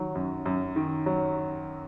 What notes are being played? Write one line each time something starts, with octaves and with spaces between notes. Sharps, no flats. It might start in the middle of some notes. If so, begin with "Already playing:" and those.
Already playing: D#3 F#3
F#2
F#2
D#3
F#3